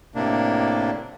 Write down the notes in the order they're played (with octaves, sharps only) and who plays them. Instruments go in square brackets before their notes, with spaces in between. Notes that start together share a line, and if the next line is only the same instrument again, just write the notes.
[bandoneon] A2 C3 A#3 D4